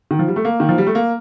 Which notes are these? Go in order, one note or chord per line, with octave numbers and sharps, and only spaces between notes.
D#3
F3
G3
A3
A#3
D#3
F3
G3
A3
A#3